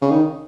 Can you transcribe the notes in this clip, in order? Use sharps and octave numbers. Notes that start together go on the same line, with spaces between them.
C#3
D#3